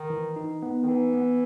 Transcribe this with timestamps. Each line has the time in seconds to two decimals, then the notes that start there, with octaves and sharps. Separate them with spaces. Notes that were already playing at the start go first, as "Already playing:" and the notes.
Already playing: D#3
0.10 E3
0.36 D#4
0.63 B3
0.83 D#3
0.87 E3 D#4
1.14 B3